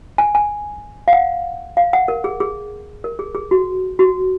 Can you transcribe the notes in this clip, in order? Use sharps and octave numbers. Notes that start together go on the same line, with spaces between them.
G#5
G#5
F5
F#5
F5
F#5
A#4
G#4
G#4
A#4
G#4
G#4
F#4
F#4